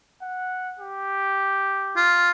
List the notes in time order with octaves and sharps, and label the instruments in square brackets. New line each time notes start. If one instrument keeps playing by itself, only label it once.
[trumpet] F#5
G4
[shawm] F4